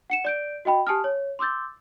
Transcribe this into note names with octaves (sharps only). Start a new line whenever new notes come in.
F#5 C#7 E7
D5 G6 D7
F#4 D#5 G5 B5
G4 G#5 A5 D#6 F6
C#5
C6 D6 E6 G6 A6